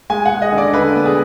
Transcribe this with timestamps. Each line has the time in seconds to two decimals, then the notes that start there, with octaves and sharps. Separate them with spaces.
0.10 G#3 G#5
0.26 F#5
0.31 G#3
0.42 D#5
0.52 D3
0.58 D5
0.73 D3 B4
0.95 B3
1.06 G#4